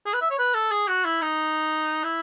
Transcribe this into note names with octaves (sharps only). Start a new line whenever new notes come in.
G#4
B4
E5
C#5
B4
A4
G#4
F#4
E4
D#4
E4